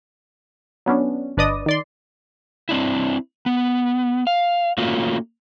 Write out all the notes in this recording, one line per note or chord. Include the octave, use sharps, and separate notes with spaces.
F#3 B3 C#4 D4
G1 D4 B4 D5 D#5 D#6
D#3 D5 C6
C4 D4 E4
B3
F5
A3 A#3 C#4 F4 F#4